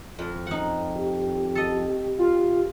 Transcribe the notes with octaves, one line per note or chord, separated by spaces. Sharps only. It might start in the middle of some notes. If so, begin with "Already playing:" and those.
F2
D#4 F#5
G4
A4 D#5
F4